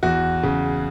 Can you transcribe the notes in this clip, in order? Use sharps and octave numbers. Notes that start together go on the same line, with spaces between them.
E2 F#4
C#3